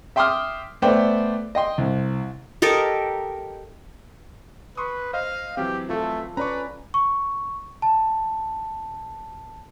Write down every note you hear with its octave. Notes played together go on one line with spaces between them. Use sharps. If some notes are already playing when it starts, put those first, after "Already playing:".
E5 G5 C6 D6 D#6 F6
A3 B3 C5 D5 G5
D#5 G5 C6
C2
G4 A4 A#4 D#5
B4 C6 C#6 D#6
C5 D#5 F5
E3 F#3 C4 G4
A3 F4 A4
C#4 B4 D5 A#5 C#6
C#6
A5